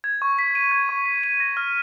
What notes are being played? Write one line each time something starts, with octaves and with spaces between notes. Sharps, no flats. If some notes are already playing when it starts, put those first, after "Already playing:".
G#6
C#6
B6
D#7
G#6
C#6
B6
D#7
A#6
F6